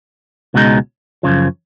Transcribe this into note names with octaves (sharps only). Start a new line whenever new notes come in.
C#2 B2 G#3 D#4
F#2 C#3 F3